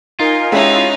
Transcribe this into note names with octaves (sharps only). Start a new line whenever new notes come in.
D#4 F4 A#4 G#5
G#3 C#4 D#4 E4 G4 G#4 E5